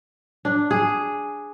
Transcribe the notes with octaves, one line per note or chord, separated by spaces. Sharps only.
D4
G#4